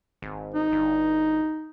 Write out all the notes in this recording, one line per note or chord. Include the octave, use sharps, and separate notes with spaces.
G#1
D#4
G1